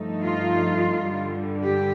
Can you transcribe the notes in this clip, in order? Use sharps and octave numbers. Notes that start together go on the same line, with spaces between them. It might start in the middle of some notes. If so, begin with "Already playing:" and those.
Already playing: G2 F3 A3 D#4
F4
G2 D3 G3
G4